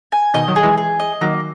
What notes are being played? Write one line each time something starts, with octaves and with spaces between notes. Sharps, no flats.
G#5
B2 D#3 D#5
D#3 F#3
G#4
E3 G#3
G#4
D#5
D#3 F#3 A#3